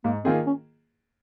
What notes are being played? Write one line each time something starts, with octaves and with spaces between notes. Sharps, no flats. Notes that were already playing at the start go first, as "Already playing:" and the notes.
G#2 A#3
D#3 A#3 C4 F4 G#4
C#4